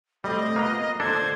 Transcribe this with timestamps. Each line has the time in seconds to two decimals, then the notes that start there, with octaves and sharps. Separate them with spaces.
0.24 G3 A3 C4 D#5
0.56 A#3 B3 F4 A#5
1.00 D3 A#3 D4 A4 C5 G#6